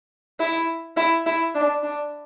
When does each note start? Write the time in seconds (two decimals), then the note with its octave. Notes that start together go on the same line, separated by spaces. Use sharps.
0.39 E4
0.96 E4
1.26 E4
1.54 D4
1.83 D4